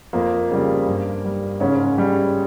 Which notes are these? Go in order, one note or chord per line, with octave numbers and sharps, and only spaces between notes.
F2 A#3
C#3 G3
G2
G3
G#2 C#3 C#4
G3